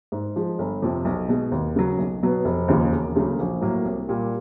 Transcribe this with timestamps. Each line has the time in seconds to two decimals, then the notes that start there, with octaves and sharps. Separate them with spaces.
0.12 G#2
0.36 F3 G#3
0.59 G1
0.82 F2 C3 F3
1.05 B1
1.29 B2 G#3
1.52 D#2
1.76 C#3 F#3
1.98 B1
2.23 B2 F#3 B3
2.45 F1
2.68 D#2 C#3 F3 A#3
2.92 E1
3.15 D2 C#3 F#3 A#3
3.39 A#1
3.61 A2 F#3 A#3
3.85 C2
4.08 A#2 G3